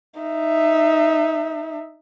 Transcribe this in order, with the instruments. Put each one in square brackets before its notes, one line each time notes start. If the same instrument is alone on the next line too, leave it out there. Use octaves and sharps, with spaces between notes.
[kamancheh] D#4 E5